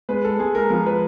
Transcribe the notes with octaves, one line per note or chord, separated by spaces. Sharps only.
G#3 B4
A4
G#3 G#4
A#4
F3 A#4
B4